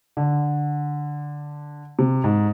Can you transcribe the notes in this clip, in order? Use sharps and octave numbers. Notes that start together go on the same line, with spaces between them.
D3
C3
G#2